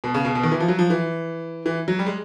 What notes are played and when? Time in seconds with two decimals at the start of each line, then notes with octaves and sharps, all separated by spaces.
0.04 B2
0.14 C#3
0.25 B2
0.35 B2
0.43 D#3
0.52 E3
0.60 F3
0.68 F#3
0.79 F3
0.90 E3
1.66 E3
1.88 F#3
1.99 G3
2.06 G#3